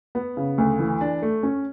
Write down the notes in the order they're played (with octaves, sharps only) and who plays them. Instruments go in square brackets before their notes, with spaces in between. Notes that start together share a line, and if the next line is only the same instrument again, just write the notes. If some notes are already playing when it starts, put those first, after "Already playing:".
[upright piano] B3
C#3
D2
E3
D4
A3
C#4